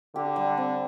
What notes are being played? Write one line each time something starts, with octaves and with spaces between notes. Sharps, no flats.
D3 G4
G3
C4